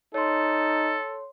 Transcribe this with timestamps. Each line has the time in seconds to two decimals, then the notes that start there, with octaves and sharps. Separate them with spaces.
0.14 D#4 A4 C#5 C6